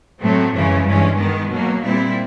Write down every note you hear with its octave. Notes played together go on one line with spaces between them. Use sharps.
A2 F#3 A3 C4
F#2 C#3 E3 G#3 C#4
G2 E3 G#3 C#4
D#3 G#3 B3
B2 F#3 A#3
A#2 G3 C4 E4